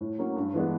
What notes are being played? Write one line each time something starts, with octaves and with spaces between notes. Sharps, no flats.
A2
F#3 A#3 C#4
G2
E3 G#3 B3 D4